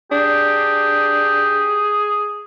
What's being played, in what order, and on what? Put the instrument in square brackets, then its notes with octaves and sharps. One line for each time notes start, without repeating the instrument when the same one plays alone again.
[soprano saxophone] D4 [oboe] G4 [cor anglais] G#4